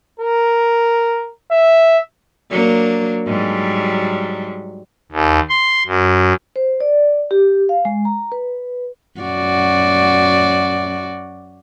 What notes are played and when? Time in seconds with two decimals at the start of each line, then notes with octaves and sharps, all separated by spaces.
0.19 A#4
1.51 E5
2.51 F#3 A#3 D4
3.27 G#2 F#3 G3
5.12 D#2
5.49 C6
5.87 F#2
6.56 C5
6.80 D5
7.31 G4
7.69 F5
7.85 G#3
8.05 A#5
8.32 B4
9.20 F#2 F#4 D5